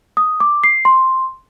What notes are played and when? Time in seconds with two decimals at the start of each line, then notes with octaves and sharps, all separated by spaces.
0.17 D#6
0.40 D6
0.64 C7
0.85 C6